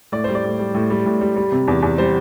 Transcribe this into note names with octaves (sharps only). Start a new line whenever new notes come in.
A2 D5
G3 C5
D5
A2
G3
A2
G3
A2
G3
G3
C3
E2
E2
G3 C5